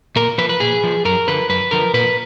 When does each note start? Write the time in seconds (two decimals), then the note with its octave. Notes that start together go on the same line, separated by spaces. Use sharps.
0.16 A#2 A#4
0.38 F3 B4
0.49 B4
0.60 A#2 G#4
0.83 F3
1.05 F#2 A#4
1.28 D3 F3 B4
1.49 F#2 B4
1.71 D3 F3 A#4
1.94 A#2 B4